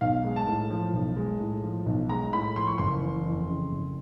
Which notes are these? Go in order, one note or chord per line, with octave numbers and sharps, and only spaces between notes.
B1 F5
G#3
A5
A2
F3
B1
G#3
A2
F3
B1
G#3 A#5
A2 B5
F3 C6
C#6
F#1 C6
E3
F2
C#3
F#1